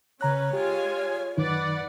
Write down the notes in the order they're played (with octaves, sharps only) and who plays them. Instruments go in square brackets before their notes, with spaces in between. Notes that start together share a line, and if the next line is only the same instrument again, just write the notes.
[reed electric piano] C#3 A#5 F#6 [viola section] C#4 B4 [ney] C#5
[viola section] G#3 F4 G#5 [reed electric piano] G4
[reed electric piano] F#2 D#3 D#4 [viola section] B4 D5 F#5